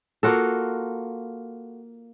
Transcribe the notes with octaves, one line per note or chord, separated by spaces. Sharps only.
A#3 F4 F#4 A4